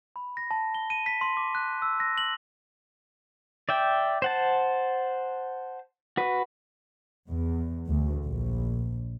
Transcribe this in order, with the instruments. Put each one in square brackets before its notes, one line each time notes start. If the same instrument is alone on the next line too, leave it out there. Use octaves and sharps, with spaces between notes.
[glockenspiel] B5
A#6
A5
G7
D#7
B6
C6
D6
F#6
E6
A#6
F#7
[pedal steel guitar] D5 E5 G5
C5 F#5 A5
F#4 B4
[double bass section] E2
D2
A#1